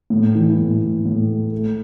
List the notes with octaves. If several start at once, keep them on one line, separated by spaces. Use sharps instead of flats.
A2
E3
A2
A2
A2
A3
A3